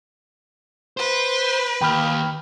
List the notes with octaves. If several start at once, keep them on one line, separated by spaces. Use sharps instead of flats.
B4 C5
D#2 G5 B5 F6